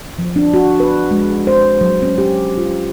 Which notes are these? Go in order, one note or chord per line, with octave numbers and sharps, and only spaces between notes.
F3
D4
F#4
B4
G#3
C5
F#3
C#4
G4
F4